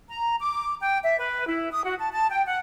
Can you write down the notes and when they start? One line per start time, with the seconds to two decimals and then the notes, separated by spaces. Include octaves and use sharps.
0.09 A#5
0.40 D6
0.80 G5
1.03 E5
1.18 B4
1.48 E4
1.72 D#6
1.85 F#4
1.98 A5
2.12 A5
2.31 G5
2.46 F#5